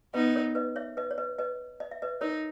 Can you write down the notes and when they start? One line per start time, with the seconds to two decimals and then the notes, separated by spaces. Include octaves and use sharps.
0.14 B3 D#4 B4 D#5
0.35 A#4 C#5
0.55 B4 D#5
0.76 C#5 E5
0.97 B4 D#5
1.11 C#5
1.18 B4 D#5
1.39 B4 D#5
1.80 D#5
1.91 E5
2.02 B4 D#5
2.21 D#4 A#4 C#5